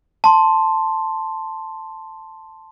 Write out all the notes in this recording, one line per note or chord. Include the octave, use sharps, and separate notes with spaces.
A5 C6